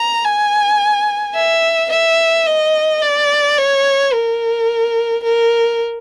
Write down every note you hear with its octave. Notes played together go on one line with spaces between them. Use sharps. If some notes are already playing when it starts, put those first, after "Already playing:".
Already playing: A#5
G#5
E5
E5
D#5
D5
C#5
A#4
A#4